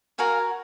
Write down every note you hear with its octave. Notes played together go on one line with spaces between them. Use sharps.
F#4 A#4 C#5 F5 G#5